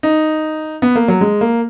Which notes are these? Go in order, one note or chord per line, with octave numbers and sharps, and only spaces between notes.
D#4
B3
A#3
F#3
G#3
A#3